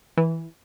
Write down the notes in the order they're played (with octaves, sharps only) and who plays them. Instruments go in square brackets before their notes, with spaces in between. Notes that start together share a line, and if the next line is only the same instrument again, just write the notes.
[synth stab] E3